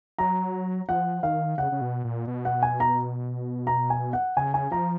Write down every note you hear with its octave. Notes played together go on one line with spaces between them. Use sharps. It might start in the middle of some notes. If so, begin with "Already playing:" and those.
F#3 A#5
F3 F#5
D#3 F5
C#3 F#5
C#3
B2
A#2
B2
F#5
G#5
A#5
A#5
G#5
F#5
C#3 G#5
G#5
F3 A#5